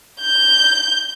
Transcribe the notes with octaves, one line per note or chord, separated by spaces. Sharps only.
G6